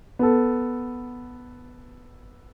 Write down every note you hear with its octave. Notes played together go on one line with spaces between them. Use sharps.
B3 A4